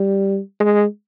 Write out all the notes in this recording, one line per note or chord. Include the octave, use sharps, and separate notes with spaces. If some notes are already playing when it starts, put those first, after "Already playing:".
Already playing: G3
G#3